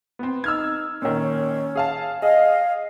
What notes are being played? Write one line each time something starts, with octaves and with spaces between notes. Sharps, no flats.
B3 C4
D#4 E6 F6 G#6
A#2 D#3 C#4
G#4 F5 A5
G#4 D#5 F5